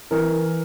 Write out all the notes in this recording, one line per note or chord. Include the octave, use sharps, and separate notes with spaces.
E3 A#4